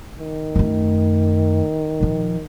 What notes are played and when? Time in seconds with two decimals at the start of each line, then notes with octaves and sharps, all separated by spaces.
0.19 D#3
0.56 F#2 A3
2.00 A#2 F3